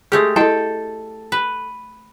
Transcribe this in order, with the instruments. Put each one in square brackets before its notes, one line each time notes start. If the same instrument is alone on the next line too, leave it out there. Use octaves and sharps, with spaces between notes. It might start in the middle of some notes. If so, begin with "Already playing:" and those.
[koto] G#3 A3 G4 [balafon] G#4
[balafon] E4 D#5 [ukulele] A4 A5 [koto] G5
[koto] B4